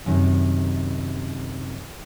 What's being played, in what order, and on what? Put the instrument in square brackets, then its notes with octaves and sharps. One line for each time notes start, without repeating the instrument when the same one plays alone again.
[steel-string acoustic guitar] F#2 C3 D#3